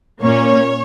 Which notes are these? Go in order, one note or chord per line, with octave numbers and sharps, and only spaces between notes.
A#2 A#3 C#4 C#5